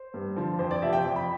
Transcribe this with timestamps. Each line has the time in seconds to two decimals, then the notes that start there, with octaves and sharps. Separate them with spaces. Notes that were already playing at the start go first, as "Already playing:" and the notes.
Already playing: C5
0.14 G2
0.36 D3 F3
0.59 F2 C5
0.71 D5
0.82 C3 F3 E5
0.93 G5
1.04 F2
1.16 B5